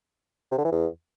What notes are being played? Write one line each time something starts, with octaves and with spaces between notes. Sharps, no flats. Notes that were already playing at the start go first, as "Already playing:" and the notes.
C3
D3
E3
E2